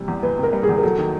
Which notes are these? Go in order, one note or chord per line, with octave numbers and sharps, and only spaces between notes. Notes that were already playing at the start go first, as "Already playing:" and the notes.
Already playing: C3 E3 G3
E2
E3 B4
C3 A#4
G3
G#4
E2
A#4
F#3 A4
D#3